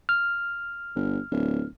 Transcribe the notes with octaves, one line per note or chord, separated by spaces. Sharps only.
F6
G1
D1